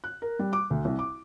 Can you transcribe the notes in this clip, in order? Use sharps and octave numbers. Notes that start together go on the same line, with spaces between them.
F#6
A#4
G3
D6
D2
C2
D6